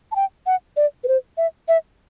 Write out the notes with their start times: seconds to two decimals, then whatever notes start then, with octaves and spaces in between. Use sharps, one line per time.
0.12 A5
0.16 G5
0.46 F#5
0.77 D5
1.04 B4
1.08 C5
1.37 E5
1.68 E5